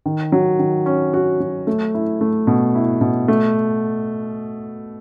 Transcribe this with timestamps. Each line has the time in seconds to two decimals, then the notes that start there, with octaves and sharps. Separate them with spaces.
0.06 D#3
0.32 F#3
0.59 D#3
0.86 C#4
1.14 F#4
1.40 F#3
1.67 A3
1.95 E4
2.21 A3
2.47 B2
2.75 E4
3.01 B2
3.28 A3